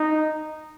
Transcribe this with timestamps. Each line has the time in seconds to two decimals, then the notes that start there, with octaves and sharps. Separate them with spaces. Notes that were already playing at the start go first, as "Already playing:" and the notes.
Already playing: D#4